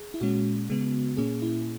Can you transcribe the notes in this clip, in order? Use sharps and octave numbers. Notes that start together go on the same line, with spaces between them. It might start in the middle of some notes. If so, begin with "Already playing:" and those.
Already playing: G#4
E4
A#2 G#3 C#4 F#4
C#3 G#3 B3
A#2 A#3 C#4 G#4
E4